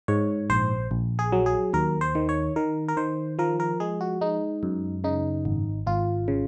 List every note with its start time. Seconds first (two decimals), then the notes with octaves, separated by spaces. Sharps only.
0.08 G#2 C#5
0.50 A#1 C5
0.91 A#1
1.19 G#4
1.32 F#3
1.46 G#4
1.73 D#2 A#4
2.01 C5
2.15 D#3
2.29 C#5
2.56 D#3 A#4
2.88 A#4
2.97 D#3 C5
3.39 F3 A#4
3.60 A#4
3.80 G#3 G#4
4.01 F#4
4.21 G#3 D#4
4.63 F#2
5.04 C#3 D#4
5.45 G#1
5.87 G#1 F4
6.28 C#3